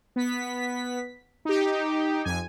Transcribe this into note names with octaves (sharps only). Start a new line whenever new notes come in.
B3 B6
D#4 G4
F2 G#5